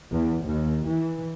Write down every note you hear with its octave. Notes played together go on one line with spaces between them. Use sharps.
E2
D#2
E3